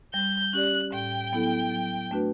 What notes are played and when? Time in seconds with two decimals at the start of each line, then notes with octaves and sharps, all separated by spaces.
0.13 G3 G6
0.53 C#4 G4 D5 F#6
0.92 A2 G5
1.32 F#3 B3 E4 A4
1.71 F#3
2.11 A3 D4 F#4 B4